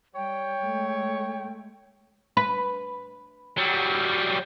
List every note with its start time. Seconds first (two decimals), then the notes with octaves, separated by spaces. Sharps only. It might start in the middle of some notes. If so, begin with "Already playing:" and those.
0.15 G3 C#5 G5
0.62 G#3 A3
2.37 B4
3.57 F#3 G3